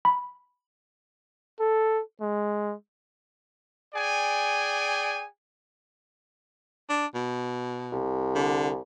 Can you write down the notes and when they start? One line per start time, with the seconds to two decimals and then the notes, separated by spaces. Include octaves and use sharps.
0.05 B5
1.60 A4
2.21 G#3
3.94 G#4 D5 G5 G#5
6.89 D4
7.14 B2
7.92 C2
8.35 D3